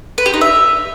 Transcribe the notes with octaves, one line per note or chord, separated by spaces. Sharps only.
B4
G4
D#4
E5